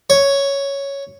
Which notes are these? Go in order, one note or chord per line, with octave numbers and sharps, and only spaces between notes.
C#5